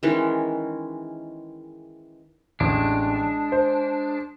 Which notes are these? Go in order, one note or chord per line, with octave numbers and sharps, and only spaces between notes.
D#3 E3 G#3 C#4
A1 G#3 D4
C5